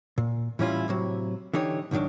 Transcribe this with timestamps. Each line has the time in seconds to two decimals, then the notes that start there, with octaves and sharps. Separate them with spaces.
0.18 A#2
0.59 A2 E3 G3 C#4 E4 F4
0.88 A2 C3 F#3
1.54 D3 E3 D#4 G4 C#5
1.91 C#2 G#2 D#3 F#3 D4